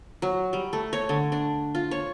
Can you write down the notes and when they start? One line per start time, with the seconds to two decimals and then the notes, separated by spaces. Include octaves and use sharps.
0.22 F#3
0.53 G3
0.73 A3
0.93 C#5
1.09 D3
1.32 D4
1.75 F4
1.91 C#5